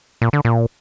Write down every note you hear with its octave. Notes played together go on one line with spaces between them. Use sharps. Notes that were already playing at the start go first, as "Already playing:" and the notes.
A#2
D3
A#2